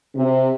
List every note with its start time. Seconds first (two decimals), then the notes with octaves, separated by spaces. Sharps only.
0.15 C3